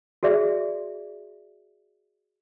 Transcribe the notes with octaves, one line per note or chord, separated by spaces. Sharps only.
F#4 G#4 D5 E5